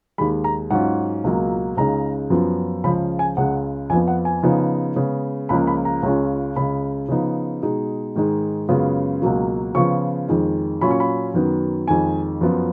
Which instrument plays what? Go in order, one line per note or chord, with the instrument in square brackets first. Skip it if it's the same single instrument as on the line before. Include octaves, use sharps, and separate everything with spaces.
[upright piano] D#2 D#3 G#3 B5
A#5
G#2 F#3 C#4 F4 F#5
C#2 B2 F#3 A#3 F4
C#2 C#3 G#3 D#4 A#5
F#2 F3 B3 F4
C#2 C#3 F3 B5
G#5
C#2 C#3 G#3 F#5
F2 G#5
F3 B3
F#5
G#5
C#3 F3 B3 D#4
C#3 G#3 B3
C#2 C#3 F3 A#3 B5
B5
A#5
C#2 C#3 G#3 C#4 F4
C#2 C#3 G#3 B5
C#3 F3 B3 D#4
B2 G#3 D#4
G#2 D#3 G#3 D#4
F#2 C#3 G#3 B3 F4
C#2 B2 F#3 A#3
C#3 F3 B3 F4 C#6
F2 D#3 G#3
A#2 F#3 C#4 F4 B5
C#6
B5
F#2 D#3 F#3 B3
F2 D#3 G#3 G#5
F#2 F3 B3 F4